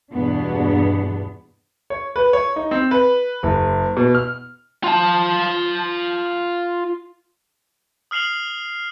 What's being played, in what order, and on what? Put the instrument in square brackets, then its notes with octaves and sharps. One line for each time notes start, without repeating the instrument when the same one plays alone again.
[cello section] E2 G2 B2 B3 D4
[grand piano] C#5
B4
C#5
D#4
C4
B4
F#1
B2
F6
[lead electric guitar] F4 A5
[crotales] D#6 F6 C7 F7 F#7